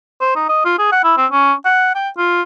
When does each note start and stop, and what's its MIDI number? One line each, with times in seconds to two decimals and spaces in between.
0.21 0.35 72
0.35 0.44 63
0.49 0.65 75
0.65 0.74 65
0.79 0.87 68
0.92 1.01 78
1.04 1.13 64
1.17 1.26 60
1.31 1.53 61
1.65 1.91 78
1.95 2.09 79
2.18 2.42 65